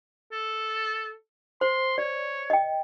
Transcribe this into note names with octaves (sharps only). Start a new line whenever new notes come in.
A4
C5 C6
C#5 D5
D#5 G5